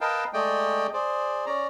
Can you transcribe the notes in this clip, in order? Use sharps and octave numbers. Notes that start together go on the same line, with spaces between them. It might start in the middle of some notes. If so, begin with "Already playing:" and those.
A#4 B4 D#5 F5 G5 A5
G#3 A3 D5 D#5 G5
G#4 C5 D5
C#4 D5 A#5